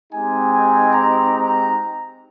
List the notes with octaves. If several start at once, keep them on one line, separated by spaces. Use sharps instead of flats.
G#3 C4 D#4 G4 G#5
G#5
A#5
A#5